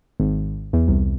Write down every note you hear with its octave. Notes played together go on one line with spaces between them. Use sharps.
G#1
E2
C2